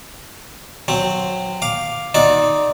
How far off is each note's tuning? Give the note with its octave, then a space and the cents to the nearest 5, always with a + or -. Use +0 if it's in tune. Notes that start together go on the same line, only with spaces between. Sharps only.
F#3 -15 C4 +0
F5 +0 D6 +0
D#4 +0 F#4 -40 D5 +0